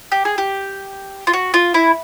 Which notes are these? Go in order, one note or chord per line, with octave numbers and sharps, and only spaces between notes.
G4
G#4
G4
F4
F#4
F4
E4